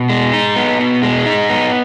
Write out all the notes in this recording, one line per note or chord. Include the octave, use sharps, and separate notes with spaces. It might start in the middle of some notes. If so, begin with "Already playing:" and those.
Already playing: B2
G#3
D#4
B3
B2
G#3
D#4
B3